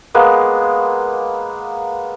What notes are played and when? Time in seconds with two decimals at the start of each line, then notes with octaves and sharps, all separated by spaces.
0.14 G#3 A#3 B3